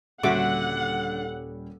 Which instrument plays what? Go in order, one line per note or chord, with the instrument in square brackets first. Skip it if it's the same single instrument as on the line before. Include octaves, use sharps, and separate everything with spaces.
[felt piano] D#1 G3 C#4 [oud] D3 [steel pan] F#4 E5 D6 [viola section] F#5